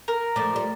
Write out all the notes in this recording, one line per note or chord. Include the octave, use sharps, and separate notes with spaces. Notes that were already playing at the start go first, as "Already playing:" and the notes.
A#4
F3 A3 D5
G3